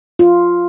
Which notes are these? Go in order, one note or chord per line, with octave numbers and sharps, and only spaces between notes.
F4